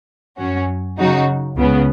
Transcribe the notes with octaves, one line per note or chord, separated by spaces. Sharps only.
F#2 F#3 C#4 F#4
C#3 F#3 D#4 F#4
C#2 C#3 B3